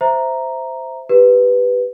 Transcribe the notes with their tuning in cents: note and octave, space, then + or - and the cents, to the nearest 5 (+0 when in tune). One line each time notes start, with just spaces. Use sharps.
C5 -10 E5 +0 A#5 +0
G4 +0 B4 +0